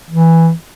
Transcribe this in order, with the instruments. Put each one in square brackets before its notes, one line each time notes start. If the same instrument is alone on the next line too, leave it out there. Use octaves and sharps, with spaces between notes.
[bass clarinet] E3